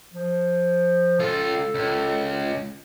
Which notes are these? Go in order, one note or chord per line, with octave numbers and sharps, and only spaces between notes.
F3
C#2 F4 A4
C#2